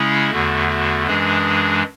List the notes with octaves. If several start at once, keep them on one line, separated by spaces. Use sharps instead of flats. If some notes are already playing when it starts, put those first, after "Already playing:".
Already playing: C#3 G#3 C#4 E4 G#4
E2 D3 A3 F#4
F#4
F#2 E3 G#3 D4 G#4